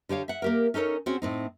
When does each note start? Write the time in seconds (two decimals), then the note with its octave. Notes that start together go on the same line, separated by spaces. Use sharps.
0.09 D3 G4 C#5 F5
0.28 E5 F#5
0.42 A#3 G4 A#4
0.74 C#4 D#4 A4 A#4 C#5
1.06 C4 C#4 F#4 G#4
1.22 A2 C4 D#4